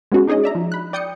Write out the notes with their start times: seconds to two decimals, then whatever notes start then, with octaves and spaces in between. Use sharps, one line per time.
0.12 G#3 B3 C#4 F#4 G#4
0.27 D4 D#4 G#4 C#5 D#5
0.43 D5 E5 A#5
0.55 F3
0.72 B5 F#6
0.93 D5 G5 D#6 G6 C#7